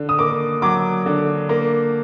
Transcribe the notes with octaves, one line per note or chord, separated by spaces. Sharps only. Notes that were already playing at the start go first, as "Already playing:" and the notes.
Already playing: D3
D#6
A#3 D6
F#3 D6
D3
A#3